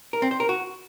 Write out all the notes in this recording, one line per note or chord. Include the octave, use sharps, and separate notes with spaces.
A#4
C4
C5
A#4
F#4